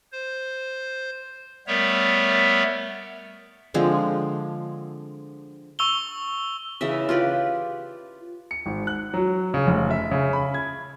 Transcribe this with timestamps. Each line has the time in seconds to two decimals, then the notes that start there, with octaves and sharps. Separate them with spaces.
0.12 C5
1.67 G3 A3 B3 A#4 C#5 E5
3.74 D3 F3 G#3 C4
5.79 C#6 E6 F7 G7
6.81 C#3 E3 D#5 E5
7.09 F4 G4 B4 D5
8.51 C#7
8.66 G#1
8.87 F#6
9.14 F#3
9.54 C#3
9.67 F1
9.91 E5
10.11 C#3
10.33 B5
10.54 G#6